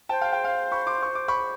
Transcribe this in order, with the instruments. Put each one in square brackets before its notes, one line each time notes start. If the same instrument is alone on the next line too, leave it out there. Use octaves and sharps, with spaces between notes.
[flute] C5 [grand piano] G5 A5
[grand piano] F5 G5
F5 G5
F5 G5
B5 C#6
C6 D6
C#6
D6
B5 C#6